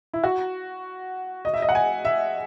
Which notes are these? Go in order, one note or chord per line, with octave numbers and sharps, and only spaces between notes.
E4
F#4
D#5
E5
D#5
F#5
G#5
E5